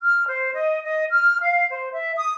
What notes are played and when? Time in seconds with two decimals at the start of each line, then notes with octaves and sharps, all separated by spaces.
0.04 F6
0.27 C5
0.54 D#5
0.84 D#5
1.10 F6
1.41 F5
1.69 C5
1.92 E5
2.16 D#6